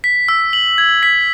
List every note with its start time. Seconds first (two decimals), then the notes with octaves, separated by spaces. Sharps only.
0.04 B6
0.29 E6
0.53 F#7
0.78 G#6
1.03 B6